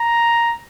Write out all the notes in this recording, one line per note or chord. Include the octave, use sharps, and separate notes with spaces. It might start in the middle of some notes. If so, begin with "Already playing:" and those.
Already playing: A#5